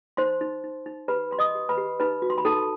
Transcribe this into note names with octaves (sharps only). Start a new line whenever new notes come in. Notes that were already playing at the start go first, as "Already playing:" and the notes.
D#4 C5 C6
D#4
D#4
D#4
G4 B4 B5
B4 C6
D#5 D#6
G4
B4 B5
G4
D#4 B4 B5
F#4
C6
B5
D#4 A4 A5